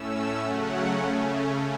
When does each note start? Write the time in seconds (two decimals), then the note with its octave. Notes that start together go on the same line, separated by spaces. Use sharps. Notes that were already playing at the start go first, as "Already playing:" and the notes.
Already playing: A2 A3 C#4 E6
0.42 C#3 F#3 A3 C#4 F#5
1.02 C#3 A3 C#4